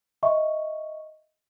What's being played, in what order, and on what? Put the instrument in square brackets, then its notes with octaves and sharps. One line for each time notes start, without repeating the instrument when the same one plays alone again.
[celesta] D#5 E5 C#6